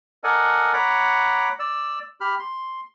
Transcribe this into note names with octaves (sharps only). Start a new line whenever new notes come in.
A4 A#4 D5 D#5 F#5 G#5
C#5 F#5 A#5 B5 D6
D5 E6
G4 B5 F6
C6